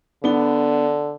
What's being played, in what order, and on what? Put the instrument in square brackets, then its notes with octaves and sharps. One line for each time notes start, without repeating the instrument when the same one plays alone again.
[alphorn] D3 [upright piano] B3 D4 G7